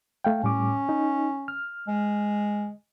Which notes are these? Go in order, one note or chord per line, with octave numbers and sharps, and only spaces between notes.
A3 F5 G5
A2 G3 C#4 D6
D#4
F6
G#3